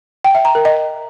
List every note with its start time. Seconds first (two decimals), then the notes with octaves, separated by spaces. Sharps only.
0.25 G5
0.35 E5
0.45 A#5
0.55 A#4
0.65 D#5